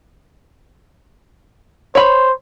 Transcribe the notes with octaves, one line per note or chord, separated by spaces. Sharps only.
C5 C#5 B5